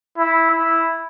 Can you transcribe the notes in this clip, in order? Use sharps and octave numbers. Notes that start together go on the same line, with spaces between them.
E4
E4